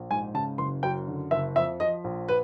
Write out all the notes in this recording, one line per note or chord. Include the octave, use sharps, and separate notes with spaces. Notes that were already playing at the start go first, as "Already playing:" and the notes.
Already playing: A#1
G#2 G#5
C#3 A5
F#1 C6
F#2 G5
D3
F#1 E5
F2 E5
F3 D#5
A#1
B4